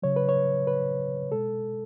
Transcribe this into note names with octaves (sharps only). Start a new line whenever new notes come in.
C#3 F#3 C#5
B4
C#5
B4
B2 G#3 A4